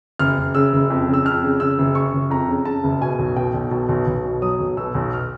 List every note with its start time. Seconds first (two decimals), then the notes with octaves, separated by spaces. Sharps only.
0.19 F#1 F6
0.37 F#1
0.55 C#3 E6
0.73 F#1
0.90 F2
1.08 C#3
1.14 E6
1.25 F2 F6
1.43 C#3
1.60 C#3 E6
1.79 F#1
1.95 C#3 C#6
2.13 F#1
2.30 F2 A#5
2.48 C#3
2.65 C#3 A5
2.84 F#1
3.01 B2 G#5
3.19 B1
3.36 B2 G5
3.54 B1
3.71 B2 A5
3.89 B1
4.07 B1
4.24 B2
4.42 F#3 D#6
4.60 B1
4.77 B2 E6
4.95 B1
5.13 F6